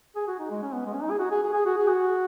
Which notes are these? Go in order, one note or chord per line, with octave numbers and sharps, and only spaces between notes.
G#4
F#4
D#4
G#3
C#4
B3
G#3
C#4
D#4
G#4
F#4
G#4
G#4
G#4
F#4
G#4
F#4